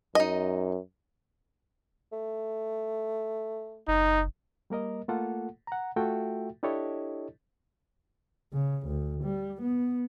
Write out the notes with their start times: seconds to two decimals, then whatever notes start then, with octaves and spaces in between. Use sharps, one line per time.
0.15 F#2 D#4 D#5
2.12 A3
3.88 F#1 D#4
4.70 G3 A#3 A#4 D#5
5.08 A3 A#3 F4 A4 F#5
5.67 F#5 A#5
5.96 A3 F4 F#4 A4 E5 G5
6.63 D4 E4 G4 A4 C#5 D#5
8.53 C#3
8.87 D2
9.24 G3
9.62 B3